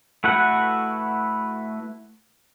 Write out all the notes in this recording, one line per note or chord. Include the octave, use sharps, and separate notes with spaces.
A3 E4 F#4 B4 F#5